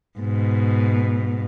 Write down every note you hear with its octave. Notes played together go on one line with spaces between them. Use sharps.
G#2 B2